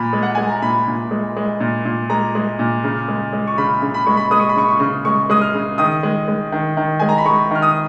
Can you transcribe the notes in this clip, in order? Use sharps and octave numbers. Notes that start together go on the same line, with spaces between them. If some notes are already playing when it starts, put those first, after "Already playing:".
Already playing: A#2 B5
G#3
F#5
G#3 G#5
A#5
A#2 B5
A#2
G#3
G#3
A#2
A#2
G#3 A#5
G#3
A#2
C#3
G#3
G#3
C#6
C#3 B5
C#3
B5
G#3 C#6
B5
G#3 D#6
C#6
B5
C#3 C#6
C#6
C#3
G#3 C#6
G#3 D#6
F6
C#3
D#3 D#6
G#3
G#3
D#3
D#3
G#3 G#5
A#5
B5
G#3 C#6
D#3 F6
D#6